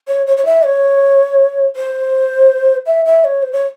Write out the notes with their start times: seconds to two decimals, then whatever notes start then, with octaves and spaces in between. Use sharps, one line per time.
0.08 C#5
0.27 C#5
0.37 C#5
0.45 E5
0.65 C#5
1.76 C5
2.87 E5
3.06 E5
3.25 C#5
3.43 C5
3.53 C#5